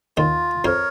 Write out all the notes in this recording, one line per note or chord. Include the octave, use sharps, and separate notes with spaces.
D#2 D#3 F4
F2 F3 A#4 C#5